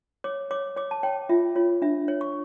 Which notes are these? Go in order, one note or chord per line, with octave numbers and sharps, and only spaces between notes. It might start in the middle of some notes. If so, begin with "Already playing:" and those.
C#5 D6
C#5 D6
C#5 D6
A5
C#5 G5
F4 E5
F4 C#5
D4 E5
C#5
C#6